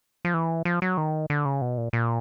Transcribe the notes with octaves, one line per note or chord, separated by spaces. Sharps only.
F3
E3
F3
F#3
D#3
D3
C#3
B2
A#2
A#2